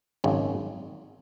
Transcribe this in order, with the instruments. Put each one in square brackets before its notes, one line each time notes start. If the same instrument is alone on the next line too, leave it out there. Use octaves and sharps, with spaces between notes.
[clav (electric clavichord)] G#1 F#2 C#3 G#3